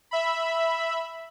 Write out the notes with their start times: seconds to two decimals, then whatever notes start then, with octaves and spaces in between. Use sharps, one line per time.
0.11 E5 B5